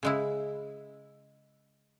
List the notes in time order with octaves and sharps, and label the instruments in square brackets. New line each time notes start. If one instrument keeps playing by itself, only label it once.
[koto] C#3 G#3 E4